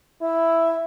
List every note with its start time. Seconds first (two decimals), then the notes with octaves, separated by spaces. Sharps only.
0.21 E4 E5